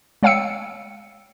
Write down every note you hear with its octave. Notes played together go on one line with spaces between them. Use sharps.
G#3 C#5 F5 G5 E6 C#7